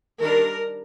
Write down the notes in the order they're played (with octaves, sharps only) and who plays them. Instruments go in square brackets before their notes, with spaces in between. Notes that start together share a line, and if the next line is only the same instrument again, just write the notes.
[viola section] D#3 G3 D4 A#4